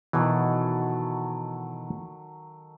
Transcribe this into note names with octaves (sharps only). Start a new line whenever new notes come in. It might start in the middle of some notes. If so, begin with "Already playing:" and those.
B2 D#3 E3 F#3 A4